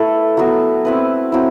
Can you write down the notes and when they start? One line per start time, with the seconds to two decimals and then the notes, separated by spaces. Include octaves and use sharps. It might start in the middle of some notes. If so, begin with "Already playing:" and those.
Already playing: A3 E4 A4 B4
0.37 F#3 B3 F#4
0.85 C4 E4 B4
1.32 F#3 C4 E4